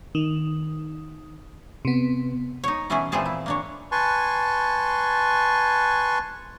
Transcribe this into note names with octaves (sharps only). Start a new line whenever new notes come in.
D#3
C3 B3
D#4 C#5
B2 E3 C#4 E4 G#4
A#2 E3 F3 C4 G#4 A5
E4
A#3 D4 C#5
B4 G#5 A5 C6 C#6